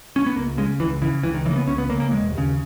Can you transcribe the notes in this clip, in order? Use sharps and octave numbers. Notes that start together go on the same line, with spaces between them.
C#4
B3
C#2 A#3
C#3 G#3
C#2 E3
C#3 E3
C#2 E3
D#3
C#3 E3
A#3
B3
C#2 C#4
B3
C#3 A#3
A#3
E1 G#3
D#2 C#3